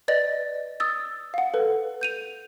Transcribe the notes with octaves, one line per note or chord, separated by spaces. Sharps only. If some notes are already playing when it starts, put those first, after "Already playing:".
B4 D5 D#5 A6
D#6 E6 A6
F5 F#5
A4 B4
G6 D#7 F7